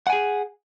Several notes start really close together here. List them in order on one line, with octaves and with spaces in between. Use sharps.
F#5 G#5 G#4